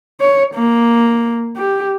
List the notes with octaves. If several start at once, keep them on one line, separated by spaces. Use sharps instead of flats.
C#5
A#3
G4